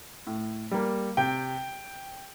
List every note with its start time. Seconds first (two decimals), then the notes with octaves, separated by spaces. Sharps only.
0.27 A2
0.71 G3 A#3
1.17 C3 G5